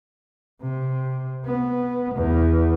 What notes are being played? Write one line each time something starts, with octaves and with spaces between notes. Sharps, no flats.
C3
B3
E2